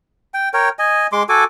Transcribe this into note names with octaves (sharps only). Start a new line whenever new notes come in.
G5
A#4 C#5 G5
D#5 G#5
G#3 C6 D6
F#4 A4 G#5 D6